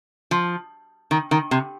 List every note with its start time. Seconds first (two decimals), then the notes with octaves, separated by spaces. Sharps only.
0.31 F3
1.11 D#3
1.31 D#3
1.51 C3